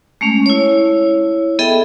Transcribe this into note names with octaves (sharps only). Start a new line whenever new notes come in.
G#3 A3 C#4
E4 C#5
B3 G#4 A4 D#5 E5 G5